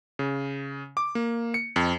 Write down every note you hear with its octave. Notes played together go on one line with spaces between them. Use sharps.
C#3
D6
A#3
C#7
F2